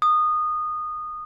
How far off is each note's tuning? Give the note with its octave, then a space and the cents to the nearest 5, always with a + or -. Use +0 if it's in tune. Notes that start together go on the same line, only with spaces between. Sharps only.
D#6 -20